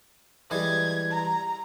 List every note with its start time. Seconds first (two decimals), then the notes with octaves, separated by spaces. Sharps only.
0.51 E3 G3 G#3 G#6
1.12 A#5